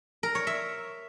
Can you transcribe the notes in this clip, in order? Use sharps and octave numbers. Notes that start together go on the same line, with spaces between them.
A#4
C#5
E5